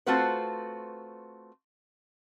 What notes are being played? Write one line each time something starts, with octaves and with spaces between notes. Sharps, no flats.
A3 C4 F4 F#4 B4 C5